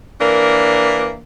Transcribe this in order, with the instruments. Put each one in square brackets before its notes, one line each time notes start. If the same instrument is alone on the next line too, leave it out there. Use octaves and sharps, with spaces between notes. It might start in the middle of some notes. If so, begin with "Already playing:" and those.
[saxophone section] E3 A#3 D4 A#4